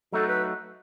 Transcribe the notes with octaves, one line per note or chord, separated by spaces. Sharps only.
F#3 A3 D#4 F#4 A4
B4